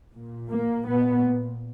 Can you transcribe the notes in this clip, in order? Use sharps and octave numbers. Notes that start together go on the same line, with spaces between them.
A#2
A#3
A#2 B3